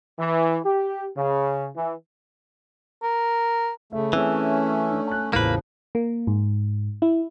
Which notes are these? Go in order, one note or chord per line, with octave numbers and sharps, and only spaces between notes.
E3
G4
C#3
E3
A#4
C#3 A3 E5
E3 A3 C4 C#4 G#4 E6
D4
A5 F#6
A1 E2 C#3 F3 A#3 B4
A#3
G#2
E4